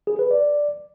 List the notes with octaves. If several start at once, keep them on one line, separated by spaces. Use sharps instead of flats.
G#4
B4
D5